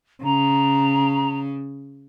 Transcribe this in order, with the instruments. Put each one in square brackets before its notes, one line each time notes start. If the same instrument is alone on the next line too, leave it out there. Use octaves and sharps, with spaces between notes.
[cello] C#3 [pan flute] A#5